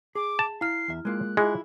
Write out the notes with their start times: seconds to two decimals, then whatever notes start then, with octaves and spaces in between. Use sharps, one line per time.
0.15 G#4 D6
0.39 A5
0.61 E4 F5 F6 C7
0.88 E2 E5
1.05 G#3 A#3 F4 F#6
1.37 G#3 E4 F4 G#4